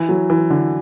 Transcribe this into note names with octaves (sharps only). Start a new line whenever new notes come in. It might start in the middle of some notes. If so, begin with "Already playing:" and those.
Already playing: E3
F#3
E3
D3